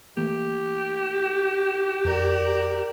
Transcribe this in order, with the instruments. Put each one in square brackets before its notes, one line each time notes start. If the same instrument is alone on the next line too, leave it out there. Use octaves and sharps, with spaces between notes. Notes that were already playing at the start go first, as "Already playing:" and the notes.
[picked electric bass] E3 A3 A#3 [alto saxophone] G4
[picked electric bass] F2 [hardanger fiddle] A#4 D5